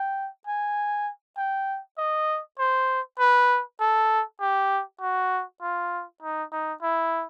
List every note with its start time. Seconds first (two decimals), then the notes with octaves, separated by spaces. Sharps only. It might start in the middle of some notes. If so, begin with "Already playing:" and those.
Already playing: G5
0.47 G#5
1.37 G5
1.98 D#5
2.59 C5
3.19 B4
3.80 A4
4.40 G4
5.01 F#4
5.62 F4
6.22 D#4
6.52 D#4
6.82 E4